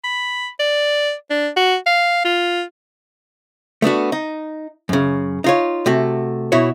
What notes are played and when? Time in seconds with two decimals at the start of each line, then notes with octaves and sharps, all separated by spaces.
0.04 B5
0.59 D5
1.30 D4
1.57 F#4
1.87 F5
2.25 F4
3.82 A3 B3 D4 F#4
4.12 D#4
4.89 F#2 C#3
5.44 D#4 F4 C#5
5.86 C3 A3 F#4
6.52 B2 E4 F#4 C#5